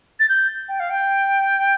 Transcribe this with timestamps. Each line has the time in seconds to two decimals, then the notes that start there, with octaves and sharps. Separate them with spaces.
0.19 A6
0.29 G6
0.68 G5
0.79 F5
0.90 G5